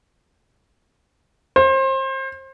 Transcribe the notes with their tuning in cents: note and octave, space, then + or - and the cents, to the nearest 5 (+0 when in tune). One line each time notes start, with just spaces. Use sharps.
C5 +30